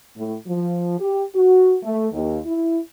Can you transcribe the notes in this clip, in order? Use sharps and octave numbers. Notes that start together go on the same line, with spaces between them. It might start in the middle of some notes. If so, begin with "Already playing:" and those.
A2
F3
G4
F#4
A3
D#2
E4